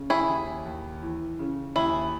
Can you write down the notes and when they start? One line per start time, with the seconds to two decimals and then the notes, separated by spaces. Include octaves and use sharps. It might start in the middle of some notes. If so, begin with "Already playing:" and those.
Already playing: C#3
0.10 E4 G#4
0.28 D#2
0.65 D#2
1.02 E3
1.39 C#3
1.75 D#2 E4 G#4